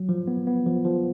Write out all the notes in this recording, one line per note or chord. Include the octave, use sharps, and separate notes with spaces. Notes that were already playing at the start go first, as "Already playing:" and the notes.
Already playing: F#3
F3
B3
B3
F3
F3